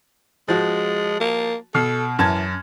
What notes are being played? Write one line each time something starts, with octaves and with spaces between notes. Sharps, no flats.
F3 G#3 F#4
A#3
B2 A4 F6 C7
F#2 E3 A5 G#6